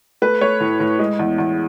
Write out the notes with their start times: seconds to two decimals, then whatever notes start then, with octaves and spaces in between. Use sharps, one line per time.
0.22 A3 B4
0.41 A3 C#5
0.60 A2
0.80 A2
0.99 G#3
1.19 E2
1.38 E2